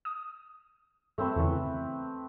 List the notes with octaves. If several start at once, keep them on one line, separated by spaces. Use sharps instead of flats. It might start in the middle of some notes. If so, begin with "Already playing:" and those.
D#6
G2 A3 C4 B4
E2 C#3 E3